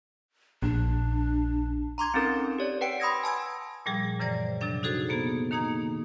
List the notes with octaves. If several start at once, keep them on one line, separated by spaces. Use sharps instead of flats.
A#1 D4
A#5 C6 D6 G#6
C4 C#4 D#4 A4 A#4
G4 C#5 D5
B4 F#5 G5 C#7 D7
B5 C6 D#6 E6 G#6 A#6
G#5 A5 E6 G#6
A#2 F3 G3 G#4
F#2 C#3 E3 C5 D5 A#6
C3 F#3 D4 A6
D#4 F#4 G#4 A4 C5
A#3 B3 G#4
D#3 A#3 D#4 A#5 G#6